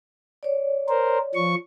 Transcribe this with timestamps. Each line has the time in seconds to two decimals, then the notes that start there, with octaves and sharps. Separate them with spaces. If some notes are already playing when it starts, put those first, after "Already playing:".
0.43 C#5 D5
0.89 A#4 C5
1.35 F3 C#6